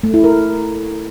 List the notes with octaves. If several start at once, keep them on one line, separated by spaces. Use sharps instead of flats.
A3
E4
A#4